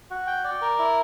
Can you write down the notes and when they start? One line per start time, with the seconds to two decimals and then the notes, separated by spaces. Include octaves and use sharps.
0.11 F#4
0.27 G5
0.44 D5
0.61 A#4
0.79 E4